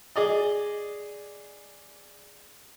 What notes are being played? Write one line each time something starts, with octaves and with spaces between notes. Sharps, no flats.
G#4 D5 D#5